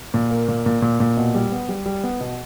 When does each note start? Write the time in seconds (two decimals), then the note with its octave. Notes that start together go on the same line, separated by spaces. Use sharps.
0.14 A#2
0.31 A#3
0.48 A#2
0.66 A#2
0.82 A#2
1.00 A#2
1.17 B2
1.35 G3
1.52 B3
1.69 G3
1.86 G3
2.04 B3
2.21 B2